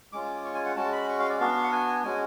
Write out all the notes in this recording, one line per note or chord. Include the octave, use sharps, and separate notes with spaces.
G#3 C#4 F4 D6
C#6
G#5
F#5
G#3 C#4 F#4 A5
B5
C#6
F5
D5
B3 D4 F#4 F5
F#5
G#5
G#3 C#4 F#4 G#5